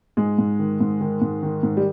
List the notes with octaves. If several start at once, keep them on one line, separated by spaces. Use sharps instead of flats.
G#2 G#3
G#2
D#3
G#2
D#3
G#2
D#3
G#2
G3